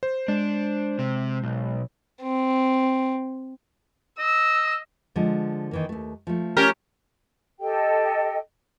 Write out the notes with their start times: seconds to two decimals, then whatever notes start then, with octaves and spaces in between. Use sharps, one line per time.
0.03 C5
0.28 G#3 D4
0.99 C3
1.44 B1
2.22 C4
4.19 D#5 E6
5.16 D3 F3 G#3
5.71 D#3 E3 A#3
5.89 D#2 A3
6.27 F3 A3
6.57 C#4 G4 A#4
7.60 G4 A4 D#5 G5